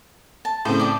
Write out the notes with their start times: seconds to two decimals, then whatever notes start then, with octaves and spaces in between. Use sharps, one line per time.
0.45 A5
0.65 A2 C#3 C4 C5
0.80 D5 A5